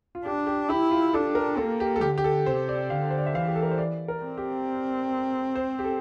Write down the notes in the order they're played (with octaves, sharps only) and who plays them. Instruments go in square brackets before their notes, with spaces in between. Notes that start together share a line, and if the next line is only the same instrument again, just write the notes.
[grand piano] F4
[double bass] D4 [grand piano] G4
[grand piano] G4
[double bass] E4 [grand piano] G4
[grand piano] F4
[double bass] D4 [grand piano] A4
[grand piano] A#4
[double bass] A#3 [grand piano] A4
[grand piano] G4
A4
[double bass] D3 [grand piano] G4
[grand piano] G4
A4
[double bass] C3 [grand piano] C5
[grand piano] D5
[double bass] D3 [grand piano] F5
[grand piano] C5
D5
E5
[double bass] E3 [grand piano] F5
[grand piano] G4
A4
A#4
C5
D5
A#4
[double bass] C4
[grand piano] G4
C5
G4
A4